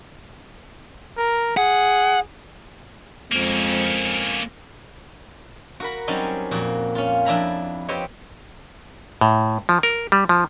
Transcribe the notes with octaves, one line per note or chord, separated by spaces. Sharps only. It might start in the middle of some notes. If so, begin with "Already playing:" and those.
A#4
G#4 F#5
F2 G#3 A#3 C#4 C5
F#4 A#4 B5
F#3 G3 C4 C#4 D#4 G4
F2 A#2 F#4
C#4 F4
F2 D4 E4 A#5 B5
C4 G4 B4 C#5 D#5
A2
F3
A#4
G3
F3